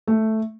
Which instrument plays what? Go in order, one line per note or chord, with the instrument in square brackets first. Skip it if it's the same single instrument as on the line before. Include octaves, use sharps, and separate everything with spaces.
[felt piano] A3